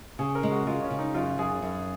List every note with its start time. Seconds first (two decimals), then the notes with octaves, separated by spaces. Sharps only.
0.19 C#3 G#4
0.35 A#4
0.43 G#3
0.51 F#4
0.67 G#3 F4
0.83 C#4
0.90 C#3
0.99 D#4
1.14 F#2 F4
1.38 F#2 G#4
1.62 F#2